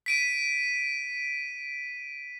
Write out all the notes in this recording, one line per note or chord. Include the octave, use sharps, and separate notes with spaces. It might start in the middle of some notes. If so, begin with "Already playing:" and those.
B6 D7 D#7